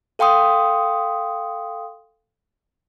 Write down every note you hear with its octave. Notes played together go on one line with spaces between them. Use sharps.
A4 F5 G5 C6 D#6